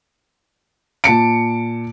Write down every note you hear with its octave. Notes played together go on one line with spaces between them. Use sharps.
A#2 A5 C#7 D7